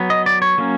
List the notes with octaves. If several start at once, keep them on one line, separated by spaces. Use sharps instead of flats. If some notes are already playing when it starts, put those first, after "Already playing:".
Already playing: F#3 B3
D#5
D5
C#5
F#3 A#3 C#4